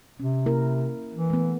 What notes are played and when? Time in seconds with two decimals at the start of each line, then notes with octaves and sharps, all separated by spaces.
0.20 C3 C#4
0.46 A#3 E4 A#4
1.13 E3
1.30 A3 B3